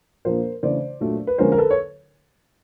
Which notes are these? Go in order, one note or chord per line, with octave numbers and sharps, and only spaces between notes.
A#2 F3 A#3 D4 A#4 C5
C#3 E3 A3 D4 C5 D5
A#2 F#3 A3 D4
B4
D3 F3 G#3 C#4 A#4 C5
A#4
A4 B4
C#5